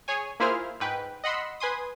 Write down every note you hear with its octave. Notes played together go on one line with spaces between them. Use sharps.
G#4 C#5 G#5
A#3 E4 F4 G#4 C5 F6
G#2 B4 G5
D#5 F#5 B5 C6 E6
B4 G#5 C6 D#6